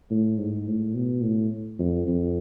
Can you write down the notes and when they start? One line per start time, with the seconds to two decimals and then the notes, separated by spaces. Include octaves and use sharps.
0.11 A2
0.39 G#2
0.67 A2
0.95 B2
1.23 A2
1.79 F2
2.07 F2